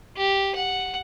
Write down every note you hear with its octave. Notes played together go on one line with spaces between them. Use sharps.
G4
F#5